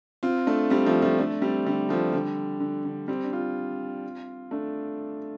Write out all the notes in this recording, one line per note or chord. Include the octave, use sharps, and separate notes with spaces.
C4 F4
A3 D4
G3 C4
F3 A3
F3 A3
A3 D4
G3 C4
D3 G3
F3 A3
D3 G3
D3
D3
G3 C4
D4
C4 F4
A3 D4